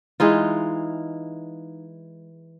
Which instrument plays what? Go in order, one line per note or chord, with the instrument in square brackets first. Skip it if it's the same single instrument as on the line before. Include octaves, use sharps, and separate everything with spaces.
[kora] E3 G#3 D#4 F4